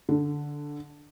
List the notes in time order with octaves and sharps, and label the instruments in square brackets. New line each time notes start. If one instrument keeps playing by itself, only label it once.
[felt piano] D3